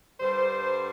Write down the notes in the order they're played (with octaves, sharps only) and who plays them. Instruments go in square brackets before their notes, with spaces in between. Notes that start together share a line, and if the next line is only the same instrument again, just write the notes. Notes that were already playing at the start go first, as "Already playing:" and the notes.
[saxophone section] G2 D3 G3 C5